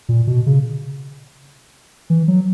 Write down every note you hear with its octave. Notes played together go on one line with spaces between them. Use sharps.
A#2
B2
C#3
E3
F#3